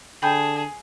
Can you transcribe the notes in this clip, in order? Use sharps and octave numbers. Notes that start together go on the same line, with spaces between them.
D3 G#4 G5 A5 B5 G6